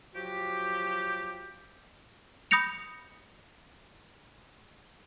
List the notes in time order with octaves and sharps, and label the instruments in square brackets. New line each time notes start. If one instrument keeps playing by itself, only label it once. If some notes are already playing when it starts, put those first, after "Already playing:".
[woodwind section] F3 F#3 F#4 G4
[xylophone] B5 D#6 G6 A#6 C#7 F7